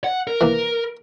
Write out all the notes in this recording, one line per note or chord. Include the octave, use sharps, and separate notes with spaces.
F#5
A#4
E3 A#3